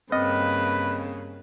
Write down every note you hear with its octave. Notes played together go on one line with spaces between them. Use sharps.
G2 C#3 A#3 C4 B4 D#5